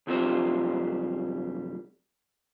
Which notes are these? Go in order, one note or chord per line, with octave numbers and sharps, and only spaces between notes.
C2 F#2 F3 G3 C4 C5